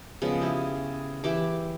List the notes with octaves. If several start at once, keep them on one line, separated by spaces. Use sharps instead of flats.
C#3 F3 G#3 B3
E4 G4
E3 E4 G4 D6